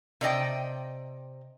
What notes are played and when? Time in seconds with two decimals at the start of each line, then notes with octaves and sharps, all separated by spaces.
0.21 C3 D5 D#5 G5